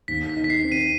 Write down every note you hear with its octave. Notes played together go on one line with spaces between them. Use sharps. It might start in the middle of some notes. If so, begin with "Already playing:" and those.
D#2 B6
B6
D#3
B6
C7
C4
D#7